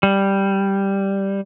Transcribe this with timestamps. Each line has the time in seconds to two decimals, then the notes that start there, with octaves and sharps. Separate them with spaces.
0.03 G3